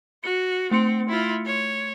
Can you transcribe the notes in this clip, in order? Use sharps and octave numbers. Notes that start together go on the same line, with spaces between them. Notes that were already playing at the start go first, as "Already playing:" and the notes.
F#4 C#7
A3 C4 C6 C#7
E4 F4
C#5